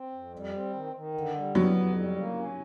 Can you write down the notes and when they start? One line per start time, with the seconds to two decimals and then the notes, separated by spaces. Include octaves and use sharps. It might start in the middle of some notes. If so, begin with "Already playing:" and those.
Already playing: C4
0.12 F2
0.33 G3
0.53 C4
0.73 D#3
0.93 D#3
1.14 D3
1.34 G3
1.54 F#3 B3
1.76 F2
1.96 G3
2.16 A#3
2.37 C#4